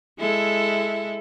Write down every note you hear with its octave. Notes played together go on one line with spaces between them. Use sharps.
G#3 E4 A4